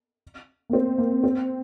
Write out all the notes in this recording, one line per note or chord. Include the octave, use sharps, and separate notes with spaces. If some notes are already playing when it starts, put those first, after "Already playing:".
A#3
C4
A#3
C4